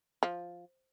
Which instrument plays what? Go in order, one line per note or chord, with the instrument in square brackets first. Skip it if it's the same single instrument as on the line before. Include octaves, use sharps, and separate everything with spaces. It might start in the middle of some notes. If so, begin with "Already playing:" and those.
[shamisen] F3